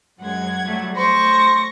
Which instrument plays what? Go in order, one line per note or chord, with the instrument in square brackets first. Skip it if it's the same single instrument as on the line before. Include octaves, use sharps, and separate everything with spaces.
[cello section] F#2 G#3 [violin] F#5 G#6
[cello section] F#3 G3 A3
[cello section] A3 [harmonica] C5 C6 [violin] C#6 A#6